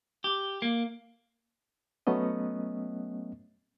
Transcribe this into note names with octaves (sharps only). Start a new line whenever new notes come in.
G4
A#3
F#3 A3 B3 C#4 D#5